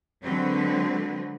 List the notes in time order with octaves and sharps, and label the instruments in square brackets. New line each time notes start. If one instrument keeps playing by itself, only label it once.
[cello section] D3 F#3 G#3 C4 B4